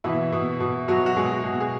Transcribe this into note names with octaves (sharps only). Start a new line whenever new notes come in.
B2 E3 E4
B2
B2
B2 F#3 F#4
F#4
B2 G#3 G#4
B2
G#4